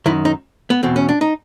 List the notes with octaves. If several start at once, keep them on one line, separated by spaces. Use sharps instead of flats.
F#2 D#3 E4
D#4
B3
E2 B2 C4
C#4
D4
D#4